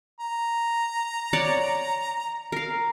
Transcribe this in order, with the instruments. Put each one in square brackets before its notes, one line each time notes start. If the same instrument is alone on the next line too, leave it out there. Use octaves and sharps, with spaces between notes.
[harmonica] A#5
[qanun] C#5 D5 F#5
A#4 F5